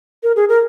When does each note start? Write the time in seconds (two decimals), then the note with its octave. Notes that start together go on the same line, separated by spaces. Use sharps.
0.23 A#4
0.36 G#4
0.49 A#4